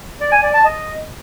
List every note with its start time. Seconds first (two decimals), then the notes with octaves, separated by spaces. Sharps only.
0.21 D5
0.32 G#5
0.43 D5
0.54 A5
0.65 D#5